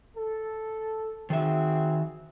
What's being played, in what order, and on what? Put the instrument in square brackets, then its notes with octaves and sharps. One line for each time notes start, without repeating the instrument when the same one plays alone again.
[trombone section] A4
[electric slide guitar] D#3 E5 [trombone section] C4 F#4 G#4